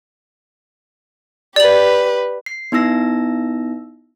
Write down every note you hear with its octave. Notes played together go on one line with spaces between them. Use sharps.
G4 B4 D5 F#7
C7
B3 D#4 E4 E6 A#6